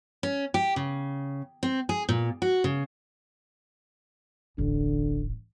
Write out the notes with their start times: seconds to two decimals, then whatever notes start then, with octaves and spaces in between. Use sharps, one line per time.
0.23 C#4
0.54 G4
0.76 C#3
1.63 C4
1.89 G#4
2.09 A#2
2.42 F#4
2.64 C#3
4.58 D#1 A1 D3